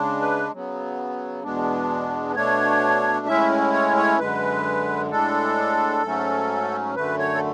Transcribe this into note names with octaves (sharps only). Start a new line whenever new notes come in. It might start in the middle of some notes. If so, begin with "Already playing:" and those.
Already playing: C#3 G#3 D4
B4
C#3 F#3 B3
E2 B2 G#3 B3 D4
B2 A3 D4 C#5
A2 G#3 C#4 E4 E5
C#5
C#5
F#2 D3 G#3 B4
A2 G#3 D4 A4
G#2 F#3 A3 C#4
F#2 D3 A3 B4
C#5
A4